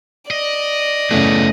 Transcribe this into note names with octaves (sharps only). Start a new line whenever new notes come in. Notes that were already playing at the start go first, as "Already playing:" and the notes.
D5 D#5
F#2 C#3 A3 B3 E4